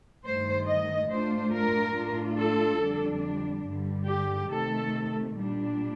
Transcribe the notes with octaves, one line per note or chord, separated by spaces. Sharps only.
G2 D#3 A3 C5
D#5
A2 A3 D4 F4 C5
A#4
A2 A3 D4 F4
A4
F2 D3 G3 D4
G2 D3 G3
G4
C3 D#3 A3 A4
A#2 G3 D4